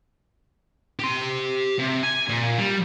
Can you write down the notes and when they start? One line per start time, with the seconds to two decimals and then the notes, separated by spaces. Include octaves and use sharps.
0.99 G4 C6
1.79 C3
2.03 G#5
2.29 A#2
2.58 G3